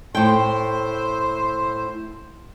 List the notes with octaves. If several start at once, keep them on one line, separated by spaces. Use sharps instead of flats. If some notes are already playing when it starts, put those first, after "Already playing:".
A2 C5 E5 G5 C6